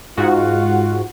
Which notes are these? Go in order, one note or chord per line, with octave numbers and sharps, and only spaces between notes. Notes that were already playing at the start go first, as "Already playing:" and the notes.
G#2 F4 F#4 F#5